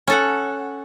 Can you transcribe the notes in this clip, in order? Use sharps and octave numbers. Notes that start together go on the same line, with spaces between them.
C#4 A4 F#5